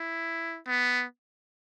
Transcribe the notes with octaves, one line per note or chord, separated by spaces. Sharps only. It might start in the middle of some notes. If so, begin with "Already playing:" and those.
Already playing: E4
B3